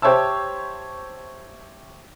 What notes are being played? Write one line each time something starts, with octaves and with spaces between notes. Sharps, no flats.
G4 C5 C#5 E5 A5 E6